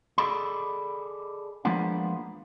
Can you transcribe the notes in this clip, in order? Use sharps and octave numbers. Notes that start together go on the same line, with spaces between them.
G#4 A4 D5 D#5 B5
F3 G#3 A#3 B3 D4 F4